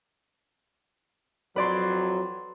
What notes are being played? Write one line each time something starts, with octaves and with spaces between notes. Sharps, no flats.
F2 F#3 B4 D5 C6